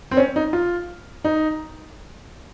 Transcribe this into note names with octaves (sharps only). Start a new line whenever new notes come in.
C4
C#4
D#4
F4
D#4